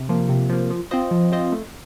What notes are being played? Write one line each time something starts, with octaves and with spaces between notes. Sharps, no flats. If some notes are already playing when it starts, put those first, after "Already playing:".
Already playing: C3
F3 A#3
C3
F3 A#3
F3
C4 F4 C5 D#5
F3
C4 F4 C5 D#5
A3